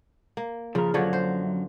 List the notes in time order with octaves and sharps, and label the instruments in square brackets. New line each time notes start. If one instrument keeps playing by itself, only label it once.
[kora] A#3
[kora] C#3 [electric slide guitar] F3 A#4
[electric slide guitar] F#2 F#3 [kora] D3 F3 C#5
[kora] C5